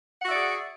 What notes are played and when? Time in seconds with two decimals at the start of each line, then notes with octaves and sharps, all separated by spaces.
0.21 F#5
0.24 F#4
0.28 E5
0.31 D5
0.35 G#4